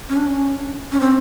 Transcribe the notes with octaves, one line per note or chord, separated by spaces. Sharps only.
C#4
D4
C#4
C#4
C4